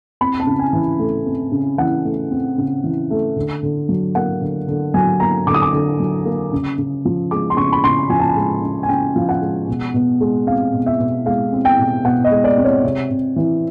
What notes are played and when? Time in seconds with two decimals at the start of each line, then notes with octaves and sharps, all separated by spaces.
0.21 C4 B5
0.40 A5
0.47 C#3
0.59 G#5
0.73 E3
0.99 A3
1.26 C4
1.52 C#3
1.78 E3 F#5
2.04 A3
2.31 C4
2.58 C#3
2.84 E3
3.11 A3
3.36 D3
3.63 D3
3.89 F#3
4.15 A#3 F#5
4.41 D3
4.68 D3
4.94 F#3 G#5
5.20 A#3 A#5
5.47 D3 D6
5.54 D#6
5.62 D6
5.74 D3
6.00 F#3
6.25 A#3
6.52 C#3
6.78 C#3
7.05 F3
7.31 G#3 D6
7.50 C6
7.57 C#3 C#6
7.73 B5
7.83 C#3 C6
8.10 F3 G#5
8.20 A5
8.29 G#5
8.36 G#3
8.62 C#3
8.83 G#5
8.89 C#3 G5
9.16 F3 F5
9.29 F#5
9.41 G#3
9.68 B2
9.94 B2
10.20 G#3
10.47 C4 F5
10.73 B2
10.86 E5
10.99 B2
11.26 G#3 F5
11.53 C4
11.65 G5
11.78 B2
12.05 B2 F#5
12.24 D#5
12.31 G#3
12.44 D5
12.58 C4
12.64 C#5
12.84 C3
13.11 C3
13.36 E3